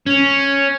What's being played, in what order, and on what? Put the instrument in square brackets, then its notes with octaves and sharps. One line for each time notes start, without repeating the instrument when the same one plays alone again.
[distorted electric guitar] C#4